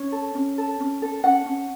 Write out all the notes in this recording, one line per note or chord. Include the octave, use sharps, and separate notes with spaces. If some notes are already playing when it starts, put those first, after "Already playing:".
Already playing: C#4 C#5
A4
C#4
A4
C#4
A4
C#4 F#5
C#4